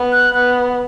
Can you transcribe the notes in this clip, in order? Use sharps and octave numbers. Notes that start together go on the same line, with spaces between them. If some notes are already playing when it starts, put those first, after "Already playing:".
Already playing: B3
F#6
B3 F#6